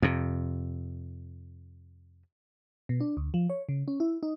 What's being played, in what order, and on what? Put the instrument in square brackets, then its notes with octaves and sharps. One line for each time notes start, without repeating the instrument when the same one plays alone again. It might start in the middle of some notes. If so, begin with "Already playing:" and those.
[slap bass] F2 C3
[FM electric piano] B2
D4
D2
F3
C#5
C#3
C#4
E4
D#4